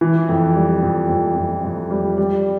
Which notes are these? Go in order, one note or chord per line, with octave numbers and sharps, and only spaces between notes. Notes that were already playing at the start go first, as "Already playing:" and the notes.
E3
F2
G3
F2
F2
F2
F2
G3
G3